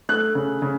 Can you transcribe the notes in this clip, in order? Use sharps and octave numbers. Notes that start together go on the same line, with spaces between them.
A3 F#6
C#3
C#3